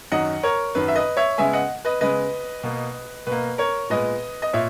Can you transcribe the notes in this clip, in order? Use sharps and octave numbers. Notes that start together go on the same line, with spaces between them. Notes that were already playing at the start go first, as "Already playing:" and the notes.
F#2 D#3 F#3 D#5 F#5
A#4 C#5
F#2 D#3 F#3 B4
E5
B4 D#5
C#5 E5
C#3 G#3 B3 E5 G#5
D#5 F#5
B4 D#5
C#3 G#3 B3 B4 D#5
B2 A#3
B2 A#3 B4
A#4 C#5
A#2 G#3 B3 B4 D#5
D#5
A#2 C#5 E5